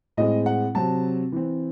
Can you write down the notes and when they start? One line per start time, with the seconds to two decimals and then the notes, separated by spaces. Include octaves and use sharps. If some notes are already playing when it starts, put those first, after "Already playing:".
0.17 A2 G#3 C4 D#5
0.46 F#5
0.75 C3 F#3 C4 A5
1.32 E3 C4